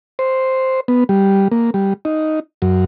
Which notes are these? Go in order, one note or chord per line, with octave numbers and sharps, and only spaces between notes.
C5
B3
G3
A#3
G3
D#4
F#2